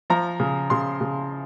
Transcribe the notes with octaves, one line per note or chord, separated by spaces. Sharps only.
F3 A#5
C#3
C#3 C6
C#3